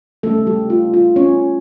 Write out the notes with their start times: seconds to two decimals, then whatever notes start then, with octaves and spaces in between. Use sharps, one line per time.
0.23 C#3 G3 A3 C#4 A4
0.47 G3 G4
0.70 F4
0.94 F4
1.16 C#4 C#5